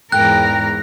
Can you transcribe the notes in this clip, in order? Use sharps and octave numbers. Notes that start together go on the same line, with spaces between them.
E2 G#2 A#4 G5 A#5 F#6